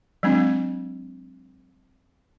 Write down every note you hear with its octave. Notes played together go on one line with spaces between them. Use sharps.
F#3 G#3 C4 D4